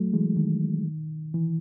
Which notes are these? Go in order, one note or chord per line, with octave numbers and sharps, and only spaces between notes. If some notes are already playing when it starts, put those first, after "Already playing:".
Already playing: F#3 A3
E3 G#3
D#3
E3